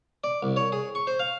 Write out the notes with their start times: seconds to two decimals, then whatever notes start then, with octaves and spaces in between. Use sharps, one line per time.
0.24 D5
0.43 C2
0.57 C#5
0.72 G#4
0.95 C#6
1.07 C5
1.19 F5